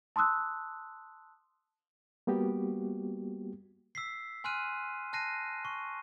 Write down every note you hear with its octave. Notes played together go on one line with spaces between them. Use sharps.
A5 C6 D#6 E6 F#6
G3 A#3 B3 F#4 G4
E6 B6 C7
G#5 C6 F6 F#6 D#7
A5 F#6 A#6 C7 D#7
C#6